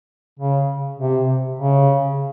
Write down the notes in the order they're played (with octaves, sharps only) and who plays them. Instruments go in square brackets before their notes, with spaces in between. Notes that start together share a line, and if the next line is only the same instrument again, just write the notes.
[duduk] C#3
C3
C#3